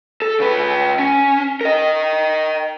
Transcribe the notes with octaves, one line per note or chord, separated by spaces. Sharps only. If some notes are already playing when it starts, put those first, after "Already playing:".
A4
C#3 B4
C#4
A#4 D#5